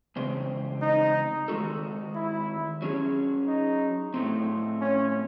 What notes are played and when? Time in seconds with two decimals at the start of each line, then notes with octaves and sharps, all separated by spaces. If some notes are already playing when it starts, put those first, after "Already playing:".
0.16 E2 C#3 G#3 C4
0.82 D#4
1.48 D#3 G#3 D#4 F#4 A4
2.15 E4
2.82 F#3 C#4 G#4
3.47 D#4
4.14 A2 F#3 A3 C4
4.81 C#4